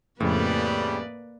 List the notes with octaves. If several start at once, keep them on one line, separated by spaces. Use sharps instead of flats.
F2 A2 C#3 G3 A#3 B4 D5